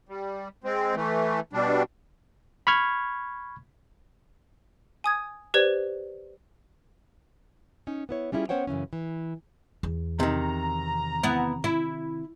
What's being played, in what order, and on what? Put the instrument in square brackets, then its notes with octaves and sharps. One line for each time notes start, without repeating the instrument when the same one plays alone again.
[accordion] G3
G#3 C4
E3 A3
B2 G3 D4
[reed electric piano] B5 C#6 F6 G#6
[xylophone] G#5 D#6 G#6
G4 B4 C5 D5 G#6
[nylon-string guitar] C#4 D#4
B3 E4 C#5
G3 C#4 D4 E4 F4 G#4
B3 C#4 C5 C#5 F#5 G5
F#2 C#3 E3 C#4
E3
[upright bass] E2
[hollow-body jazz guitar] C3 D#3 [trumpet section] A#5
[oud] B3 E4
E4